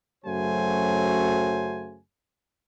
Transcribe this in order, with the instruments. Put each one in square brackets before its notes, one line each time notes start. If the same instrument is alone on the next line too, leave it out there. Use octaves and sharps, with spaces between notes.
[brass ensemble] F#2 C#3 F#3 A3 C5 G#5